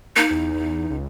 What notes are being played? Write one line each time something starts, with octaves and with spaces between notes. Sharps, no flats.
A#3 D#4
E2
E2
C#2